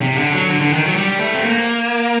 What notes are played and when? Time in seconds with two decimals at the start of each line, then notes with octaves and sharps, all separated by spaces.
0.02 C3
0.18 D3
0.33 F#3
0.49 D3
0.61 D3
0.73 D#3
0.85 F#3
0.96 G3
1.20 A3
1.34 C4
1.44 A#3